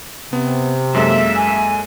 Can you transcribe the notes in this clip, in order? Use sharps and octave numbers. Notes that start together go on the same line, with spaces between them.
C3 B3
F#2 G#3 A#3 A4 E5
G#5